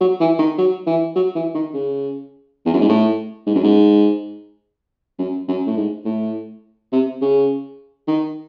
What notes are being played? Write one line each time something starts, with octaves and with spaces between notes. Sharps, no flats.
F#3
E3
D#3
F#3
E3
F#3
E3
D#3
C#3
E2
F#2
G#2
A2
G#2
F#2
G#2
F#2
F#2
A2
G#2
A2
C3
C#3
D#3